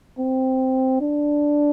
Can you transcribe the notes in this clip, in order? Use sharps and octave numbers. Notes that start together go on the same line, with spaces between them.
C4
D4